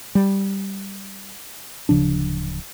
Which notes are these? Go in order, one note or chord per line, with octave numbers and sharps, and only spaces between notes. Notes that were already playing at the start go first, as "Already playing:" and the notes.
G3
D1 C#3 F3 D4